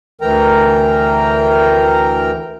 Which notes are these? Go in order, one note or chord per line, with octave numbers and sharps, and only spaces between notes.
D2 E3 A#4 G5 A#5